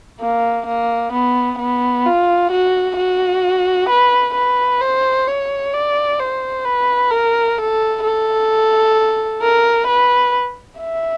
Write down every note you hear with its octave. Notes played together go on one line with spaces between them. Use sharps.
A#3
A#3
B3
B3
F4
F#4
F#4
B4
B4
C5
C#5
D5
C5
B4
A#4
A4
A4
A#4
B4
E5